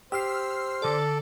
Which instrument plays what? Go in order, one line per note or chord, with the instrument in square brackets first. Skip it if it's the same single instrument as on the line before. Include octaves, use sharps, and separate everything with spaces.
[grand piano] G4 [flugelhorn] C5 [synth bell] E6 F6 C7
[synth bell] D3 D5 [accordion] A4